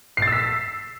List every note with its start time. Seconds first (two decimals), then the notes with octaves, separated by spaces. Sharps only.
0.17 C7
0.22 A6
0.27 E6
0.32 B6